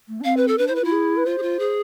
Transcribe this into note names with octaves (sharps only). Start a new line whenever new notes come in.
A3
D4
C4 F5
B4
A4
D4 B4
E4 C5
B4
F4
E4
G#4
B4
F4 C5
G#4
F4
G#4